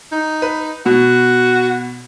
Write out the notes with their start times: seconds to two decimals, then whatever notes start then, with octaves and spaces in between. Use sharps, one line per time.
0.12 D#4
0.42 B4
0.86 B2 F#4